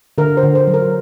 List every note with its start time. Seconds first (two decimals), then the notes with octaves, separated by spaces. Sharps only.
0.18 D3 A#4
0.37 C5
0.43 D3
0.55 C5
0.67 F#3
0.74 A#4